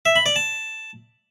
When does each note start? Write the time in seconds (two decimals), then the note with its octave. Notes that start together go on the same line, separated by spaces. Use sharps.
0.06 E5
0.16 B5
0.26 D5
0.36 A5